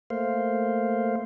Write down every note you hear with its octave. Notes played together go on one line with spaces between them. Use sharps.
A3 A#3 C5 F5